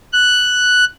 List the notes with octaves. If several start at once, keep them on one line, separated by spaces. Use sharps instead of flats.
F#6